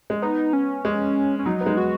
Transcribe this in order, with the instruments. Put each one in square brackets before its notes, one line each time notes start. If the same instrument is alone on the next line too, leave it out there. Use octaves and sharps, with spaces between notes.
[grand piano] G#3
[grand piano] B3 [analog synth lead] D#4
[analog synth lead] C#4
[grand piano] G#3
[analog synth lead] C#4
[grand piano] F#3 [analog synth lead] D#4
[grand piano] B3
G#3
[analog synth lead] F#4